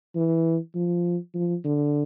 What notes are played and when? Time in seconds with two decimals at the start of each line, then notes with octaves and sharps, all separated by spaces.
0.15 E3
0.75 F3
1.35 F3
1.65 D3